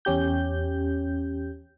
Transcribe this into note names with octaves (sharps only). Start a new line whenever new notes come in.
E2 C#4 G4 G6